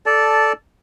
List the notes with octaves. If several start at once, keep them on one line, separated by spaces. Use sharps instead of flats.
A4 D5 A5